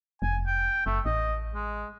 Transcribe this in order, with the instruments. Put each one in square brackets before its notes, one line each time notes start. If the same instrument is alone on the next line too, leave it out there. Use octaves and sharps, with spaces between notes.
[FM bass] F1 [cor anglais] G#5
[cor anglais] G5
[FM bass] F#1 [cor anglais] A3
[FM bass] A1 [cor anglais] D#5
[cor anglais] G#3